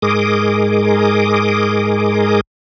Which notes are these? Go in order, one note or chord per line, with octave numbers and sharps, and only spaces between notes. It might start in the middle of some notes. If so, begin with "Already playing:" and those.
G#2 G#3 G#4 A#4 D6 D#6